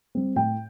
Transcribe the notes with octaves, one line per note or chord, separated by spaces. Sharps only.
G3 C4
A2 G5